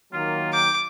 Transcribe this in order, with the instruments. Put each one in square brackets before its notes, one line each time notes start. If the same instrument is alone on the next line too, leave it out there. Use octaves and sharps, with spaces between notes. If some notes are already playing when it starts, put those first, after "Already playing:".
[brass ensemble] D#3 F#3 A#3 [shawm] F4
[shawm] G5 [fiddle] D6